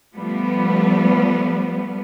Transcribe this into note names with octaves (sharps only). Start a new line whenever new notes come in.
F3 G3 A3 B3